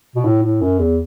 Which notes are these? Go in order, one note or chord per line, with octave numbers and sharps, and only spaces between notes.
B2
A2
A2
F#2
E2